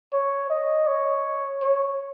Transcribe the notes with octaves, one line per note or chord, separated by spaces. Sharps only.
C#5
D#5
C#5
C#5